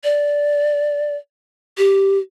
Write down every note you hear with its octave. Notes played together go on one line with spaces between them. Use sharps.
D5
G4